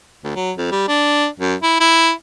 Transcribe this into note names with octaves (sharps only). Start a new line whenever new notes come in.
D2
F#3
F2
G3
D4
F#2
E4
E4